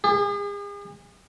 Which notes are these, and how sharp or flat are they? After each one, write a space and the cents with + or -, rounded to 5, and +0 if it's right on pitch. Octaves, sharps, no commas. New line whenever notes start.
G#4 -40